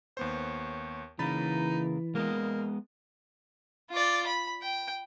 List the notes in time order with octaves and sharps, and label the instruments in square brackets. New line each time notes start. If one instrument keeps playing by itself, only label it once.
[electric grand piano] D#2 B3 C5 [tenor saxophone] C#5
[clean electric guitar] C#3 A#3 [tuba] E3 [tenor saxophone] D#4 [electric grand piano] B5 A6
[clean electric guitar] G#3 B3 D#5 [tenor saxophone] A#3
[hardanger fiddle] F4 D5
B5
G5